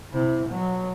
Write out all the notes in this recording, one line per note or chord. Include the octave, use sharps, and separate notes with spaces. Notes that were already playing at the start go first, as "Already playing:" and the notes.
C3 E4
B2 F#3